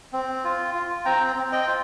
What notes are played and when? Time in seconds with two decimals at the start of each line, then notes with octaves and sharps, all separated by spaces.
0.13 C4
0.44 F4
0.74 F4
1.05 C4 G5 A#5
1.36 C4
1.52 D#5 G5
1.67 F4